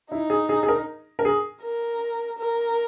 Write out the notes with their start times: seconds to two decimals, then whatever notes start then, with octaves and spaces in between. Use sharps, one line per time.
0.11 D#4 E4
0.30 G#4
0.49 G#4
0.63 G#4
0.68 A#4
1.19 A#4
1.25 G#4
1.63 A#4
2.38 A#4